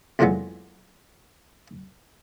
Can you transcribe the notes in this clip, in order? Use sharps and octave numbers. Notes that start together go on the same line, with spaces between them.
F2 A#2 E3 F#3 G#3 B3